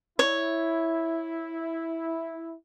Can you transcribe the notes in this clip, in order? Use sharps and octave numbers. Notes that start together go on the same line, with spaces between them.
E4 C#5